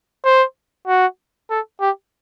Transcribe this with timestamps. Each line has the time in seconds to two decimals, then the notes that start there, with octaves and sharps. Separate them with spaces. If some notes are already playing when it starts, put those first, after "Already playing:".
0.25 C5
0.87 F#4
1.50 A4
1.81 G4